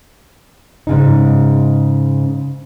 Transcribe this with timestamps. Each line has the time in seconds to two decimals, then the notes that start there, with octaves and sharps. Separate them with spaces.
0.87 G#2 C#3 D#4